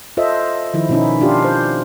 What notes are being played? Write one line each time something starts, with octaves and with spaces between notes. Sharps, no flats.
F4 A4 C5 D#5 E5
D#3 F3 E4
B2 B3 C#4 D#4 E4
F3 D4 F4 G4
C5